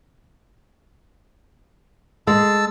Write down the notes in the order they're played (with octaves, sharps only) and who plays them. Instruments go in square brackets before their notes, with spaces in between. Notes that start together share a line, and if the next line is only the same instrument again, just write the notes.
[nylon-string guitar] G#3 [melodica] A5 E6